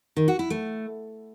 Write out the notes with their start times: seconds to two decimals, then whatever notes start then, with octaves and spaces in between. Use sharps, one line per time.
0.16 D#3
0.28 F#4
0.39 E4
0.50 A3